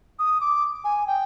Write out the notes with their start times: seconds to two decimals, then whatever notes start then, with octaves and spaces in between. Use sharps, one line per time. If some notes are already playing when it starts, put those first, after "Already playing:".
0.19 D#6
0.41 D6
0.84 G#5
1.07 G5